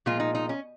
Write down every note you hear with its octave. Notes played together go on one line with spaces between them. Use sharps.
A#2 F3 G#3 F4
D#4
D#4
C#4